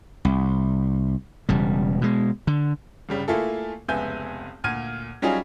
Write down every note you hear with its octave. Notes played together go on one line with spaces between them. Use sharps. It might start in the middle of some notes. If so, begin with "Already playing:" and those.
C2
E1 C#3 G3
B2 G#3
D3
G1 C#3 G3
A3 A#3 E4 F4 G#4 A4
F1 C#2 B3 E5 G#5 G6
D2 A#2 F6 G#6 D#7
F#3 G3 C#4 D#4 F4 G#4